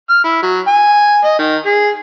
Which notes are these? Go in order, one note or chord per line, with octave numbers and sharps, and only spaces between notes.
F6
E4
F#3
G#5
D#5
D#3
G#4